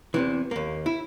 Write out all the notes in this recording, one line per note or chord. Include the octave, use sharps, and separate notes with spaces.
E2 C3 E3
D#2 A#3
E4